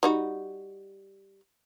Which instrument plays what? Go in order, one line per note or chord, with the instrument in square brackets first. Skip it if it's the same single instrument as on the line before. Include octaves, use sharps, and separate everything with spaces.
[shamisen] G3 D#4 F#4